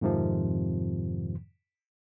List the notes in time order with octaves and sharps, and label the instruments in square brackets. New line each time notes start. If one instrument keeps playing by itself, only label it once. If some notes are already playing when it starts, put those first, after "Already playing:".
[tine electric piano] F2 G#2 C3 D#3 F3